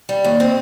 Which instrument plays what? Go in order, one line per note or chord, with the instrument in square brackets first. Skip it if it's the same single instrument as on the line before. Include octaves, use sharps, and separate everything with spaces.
[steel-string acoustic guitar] G3
D#2
C4